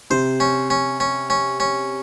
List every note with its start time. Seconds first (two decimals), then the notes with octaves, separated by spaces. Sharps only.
0.10 C3 C5
0.40 C#4
0.70 C#4
1.00 C#4
1.30 C#4
1.60 C#4